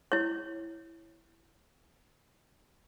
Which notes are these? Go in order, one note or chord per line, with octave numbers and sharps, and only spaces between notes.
E4 C#5